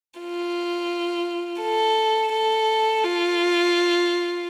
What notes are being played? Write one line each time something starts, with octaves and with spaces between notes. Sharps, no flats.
F4
A4
A4
F4